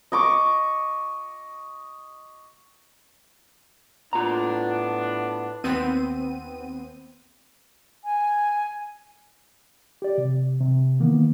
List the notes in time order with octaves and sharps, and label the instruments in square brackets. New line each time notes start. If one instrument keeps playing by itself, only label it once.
[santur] D#5 C#6 D6
[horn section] A2 B3 D4 [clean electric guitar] F4 A#5
[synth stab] D#2 B3 C4 D#7
[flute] G#5
[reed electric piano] G4 D5
C3
C3
D#3 E3 A#3 B3